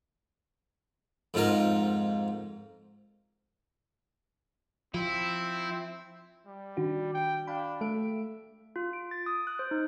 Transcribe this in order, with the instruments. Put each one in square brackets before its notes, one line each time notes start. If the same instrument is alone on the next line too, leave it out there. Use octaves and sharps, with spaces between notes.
[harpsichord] F2 G#2 F4 A#4
[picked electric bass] F3 [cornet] C4 [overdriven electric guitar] E4
[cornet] G3
[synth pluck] D#3 D4 F#4
[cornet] G5
[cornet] D4 [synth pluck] F5 G5 B5
[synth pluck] A3 A4 D7 [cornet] E5
[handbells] F4
D7
A6
D#6
F#6
C5
D#4